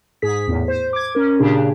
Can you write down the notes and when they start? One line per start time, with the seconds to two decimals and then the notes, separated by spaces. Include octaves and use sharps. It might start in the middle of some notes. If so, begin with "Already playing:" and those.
0.22 G#2 G#4 B6
0.48 E2 A2
0.68 C5
0.93 D6 G#6
1.15 C#4 A#4
1.39 A#2 C#3 D4 G4 G#4